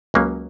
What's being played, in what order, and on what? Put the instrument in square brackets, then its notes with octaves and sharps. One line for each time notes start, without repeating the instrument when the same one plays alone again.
[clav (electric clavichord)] C#2 C#3 F#3 A#3 C#4